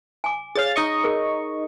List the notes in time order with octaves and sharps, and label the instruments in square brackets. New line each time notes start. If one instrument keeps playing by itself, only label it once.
[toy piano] G#5 D6
[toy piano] G#4 C#5 [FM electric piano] F5 A6
[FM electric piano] D#4 D#5 C#6
[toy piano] G#4 A#4